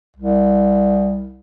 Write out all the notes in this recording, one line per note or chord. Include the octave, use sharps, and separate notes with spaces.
C2